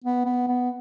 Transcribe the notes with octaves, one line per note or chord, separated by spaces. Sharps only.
B3
B3
B3